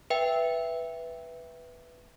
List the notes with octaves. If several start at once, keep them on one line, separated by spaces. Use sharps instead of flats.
B4 E5 G5